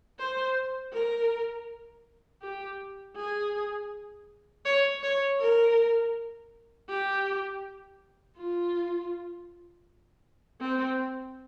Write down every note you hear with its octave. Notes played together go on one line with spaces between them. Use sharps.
C5
A#4
G4
G#4
C#5
C#5
A#4
G4
F4
C4